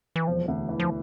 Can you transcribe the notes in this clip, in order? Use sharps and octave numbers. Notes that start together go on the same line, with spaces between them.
E3
E1 F3
D2
E3
F3